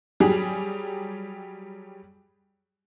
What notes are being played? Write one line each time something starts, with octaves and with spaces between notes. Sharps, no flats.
F#3 G3 G4 G#4